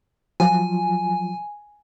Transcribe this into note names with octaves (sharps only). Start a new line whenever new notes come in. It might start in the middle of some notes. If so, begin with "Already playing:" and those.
F3 F#3 F4 G#5